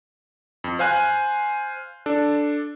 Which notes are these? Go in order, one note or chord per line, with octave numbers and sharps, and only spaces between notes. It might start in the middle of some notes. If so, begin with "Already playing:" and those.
F2
C5 F5 G#5 F#6
D4 A4